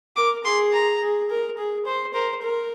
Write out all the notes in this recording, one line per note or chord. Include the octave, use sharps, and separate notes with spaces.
A#4 D6
G#4 C6
A#5
G#4
A#4
G#4
C5
A#4 C5
A#4